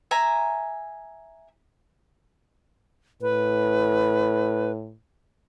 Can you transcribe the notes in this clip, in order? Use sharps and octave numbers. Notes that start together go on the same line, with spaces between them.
E5 G#5 A#5
A2 B4